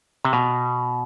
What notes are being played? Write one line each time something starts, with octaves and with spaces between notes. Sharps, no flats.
C3
B2